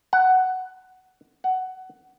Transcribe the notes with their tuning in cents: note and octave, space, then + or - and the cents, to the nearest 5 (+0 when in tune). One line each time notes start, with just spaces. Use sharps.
F#5 +10
F#5 +15